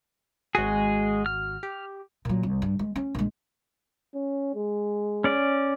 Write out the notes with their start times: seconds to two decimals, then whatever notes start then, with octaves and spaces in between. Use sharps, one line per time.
0.55 G#1 G#3 F#4 G#4
1.26 F6
1.63 G4
2.25 A#2 F#3
2.43 C2
2.62 G2
2.79 G#3
2.96 C#4
3.15 A#1 G#3
4.14 C#4
4.55 G#3
5.24 C#4 D5